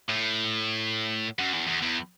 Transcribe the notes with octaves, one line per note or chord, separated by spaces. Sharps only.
A2
F#2
E2
E2
E2